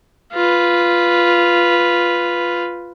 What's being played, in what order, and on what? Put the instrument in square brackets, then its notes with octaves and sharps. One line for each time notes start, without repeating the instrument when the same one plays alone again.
[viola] F4 B4